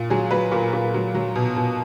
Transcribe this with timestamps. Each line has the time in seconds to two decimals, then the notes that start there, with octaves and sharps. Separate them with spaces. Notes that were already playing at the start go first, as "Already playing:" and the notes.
Already playing: A#2
0.10 F#3 G#4
0.31 F#3 B4
0.52 A#2 A#4
0.73 A#2
0.94 F#3
1.15 F#3
1.35 B2
1.56 B2